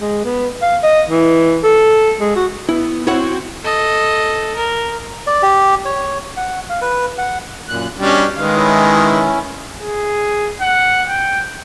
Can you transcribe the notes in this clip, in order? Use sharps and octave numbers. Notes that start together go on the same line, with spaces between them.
G#3
B3
F5
D#5
E3
A4
G#3
F#4
B3 E4
C4 E4 F#4 C#5 F#5
A4 D#5
A#4
D5
G4
C#5
F#5
F5
B4
F#5
F#2 A#2 F#6
B2 G3 C#4 D4
D#3 G#3 B4 F5
C#4 E4
G#4
F#5
G5